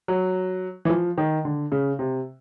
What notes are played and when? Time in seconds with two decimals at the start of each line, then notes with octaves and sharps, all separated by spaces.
0.08 F#3
0.85 E3
0.90 F3
1.18 D#3
1.45 D3
1.72 C#3
1.99 C3